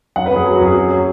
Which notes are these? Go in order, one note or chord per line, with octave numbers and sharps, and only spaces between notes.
F#2 F#5
B4
F#2 G#4
F#3 G#4
F#4
F#2 G#4
F#3
F#3